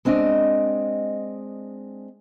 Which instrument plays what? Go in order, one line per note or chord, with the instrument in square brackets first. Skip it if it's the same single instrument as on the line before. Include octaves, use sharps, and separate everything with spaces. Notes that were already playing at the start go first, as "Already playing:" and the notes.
[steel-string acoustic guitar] G#3 C4 D4 D#5